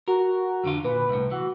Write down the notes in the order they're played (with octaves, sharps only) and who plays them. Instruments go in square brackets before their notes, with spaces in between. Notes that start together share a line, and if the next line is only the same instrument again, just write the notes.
[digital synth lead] F#4 [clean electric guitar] A#4
[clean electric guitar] F2 D3 F4
[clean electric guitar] A#2 [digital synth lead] B4
[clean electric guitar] C2 A2
[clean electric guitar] E3 [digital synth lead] F#4